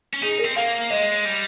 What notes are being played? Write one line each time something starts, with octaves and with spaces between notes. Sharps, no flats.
C#4
D#4 G#4
A#4
C4
A#3 F5
G#3 D#5
G3